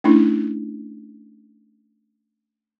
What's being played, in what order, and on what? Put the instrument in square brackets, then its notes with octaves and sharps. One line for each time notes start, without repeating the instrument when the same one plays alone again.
[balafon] A3 C#4 D4 E4